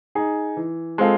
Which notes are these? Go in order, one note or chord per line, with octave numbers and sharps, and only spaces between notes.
D#4 G#4
E3
G#3 C4 F4 A4